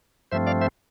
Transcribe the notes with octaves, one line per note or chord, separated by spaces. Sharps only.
G2 F3 A3 C4 C5 E5
D5 F5
C5 E5